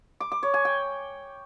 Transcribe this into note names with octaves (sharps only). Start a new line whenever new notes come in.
D6
D6
C#5
G#5
G5